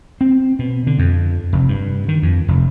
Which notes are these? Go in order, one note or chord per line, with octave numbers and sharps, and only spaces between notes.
C4
B2
D3
F2
F1
G2
D#3
F2
F1